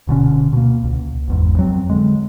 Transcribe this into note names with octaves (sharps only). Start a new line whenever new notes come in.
D1 B2 D3 C#4
B2 A#3
C#2
G#1 E2 G#2
F2 F#3 C4
D3 G#3